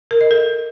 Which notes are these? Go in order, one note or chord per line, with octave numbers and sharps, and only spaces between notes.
A#4
D#5
A4